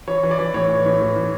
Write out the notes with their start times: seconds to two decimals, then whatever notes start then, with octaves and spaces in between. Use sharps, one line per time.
0.08 E3 C#5
0.23 E3
0.31 D5
0.39 E3
0.54 A2 C#5
0.69 E3
0.86 A2
1.01 E3
1.16 A2